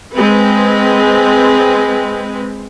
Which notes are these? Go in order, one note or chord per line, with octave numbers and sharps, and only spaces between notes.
G#3 C4 B4